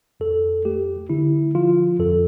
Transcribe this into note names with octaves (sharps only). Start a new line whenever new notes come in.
F2 A4
A3 G4
D3 E4
F3 F4
F2 A4